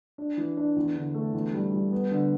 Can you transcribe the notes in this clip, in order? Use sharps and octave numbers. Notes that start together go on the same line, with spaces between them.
D4
E3
D4
E2
D3
A3
E2
G3
G3
B3
D3